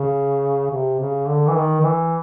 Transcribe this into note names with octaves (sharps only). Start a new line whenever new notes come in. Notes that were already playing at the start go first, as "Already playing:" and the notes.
Already playing: C#3
C3
C#3
D3
E3
D#3
D#3
E3